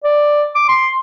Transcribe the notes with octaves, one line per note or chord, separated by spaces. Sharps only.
D5
D6
C6